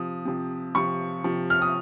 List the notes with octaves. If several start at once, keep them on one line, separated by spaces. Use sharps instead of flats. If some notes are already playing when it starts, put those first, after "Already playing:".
Already playing: C3 F3 D#6
C3 F3
C3 F3 C#6
C3 F3
F6
D#6